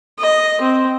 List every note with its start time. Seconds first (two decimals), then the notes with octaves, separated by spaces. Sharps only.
0.19 D#5
0.61 C4